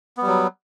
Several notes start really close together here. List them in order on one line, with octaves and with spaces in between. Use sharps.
B3 G3 F#3